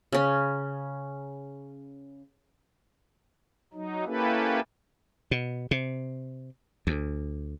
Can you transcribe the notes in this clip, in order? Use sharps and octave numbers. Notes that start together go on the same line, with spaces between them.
C#3 C#4
F#3 D#4
A#3 C#4 E4 G4 A4 B4
B2
C3
D2